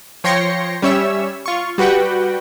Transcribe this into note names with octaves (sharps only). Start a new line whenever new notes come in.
F3 C#5 G5 C6 A#6 C#7
G3 C#4 C#5 E5 E6
F4 C#6
G3 F#4 B4 F#5 G5